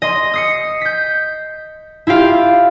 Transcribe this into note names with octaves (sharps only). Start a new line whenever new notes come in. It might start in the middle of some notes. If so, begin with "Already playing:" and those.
D#5 C6
D#6 C7 C#7
G6 B6
E4 F4 G4 F5